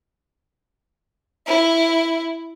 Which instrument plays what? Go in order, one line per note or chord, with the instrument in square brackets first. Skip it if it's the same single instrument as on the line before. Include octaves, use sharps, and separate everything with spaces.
[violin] E4